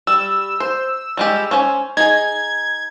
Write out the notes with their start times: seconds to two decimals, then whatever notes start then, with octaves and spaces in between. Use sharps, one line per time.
0.07 G3 E6
0.60 C5
1.17 G3 G#3 G4
1.51 C#4 C5 G#5
1.97 D#4 G#4 G#6